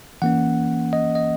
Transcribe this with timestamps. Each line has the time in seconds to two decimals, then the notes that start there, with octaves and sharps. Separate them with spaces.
0.22 E3 A#3 C#4 F#5
0.93 D#5
1.15 D#5